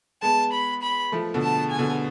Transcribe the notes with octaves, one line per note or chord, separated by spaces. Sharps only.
G#3 B3 A5
B5
B5
F3 A3
B2 D3
A5
G#5
B2 D3